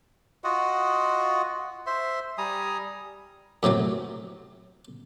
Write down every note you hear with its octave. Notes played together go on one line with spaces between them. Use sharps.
F4 F#4 D#5 F#5
C5 E5 C6
G3 G#5 A#5 D#6
F#2 A2 C3 F#3